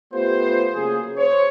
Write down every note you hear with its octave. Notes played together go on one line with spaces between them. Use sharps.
A3 B3 F4 G4 B4 C5
C#3 F#3 A#3 G#4
C5 C#5